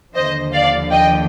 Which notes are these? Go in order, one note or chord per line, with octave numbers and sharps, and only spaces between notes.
D#2 D3 F3 C5 D#5
D5 F5
D#5 G5